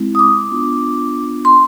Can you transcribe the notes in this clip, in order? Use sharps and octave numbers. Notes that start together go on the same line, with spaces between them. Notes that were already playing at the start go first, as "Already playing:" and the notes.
Already playing: G#3 C4 E4
D#6
D6
B3 D4 F4
C6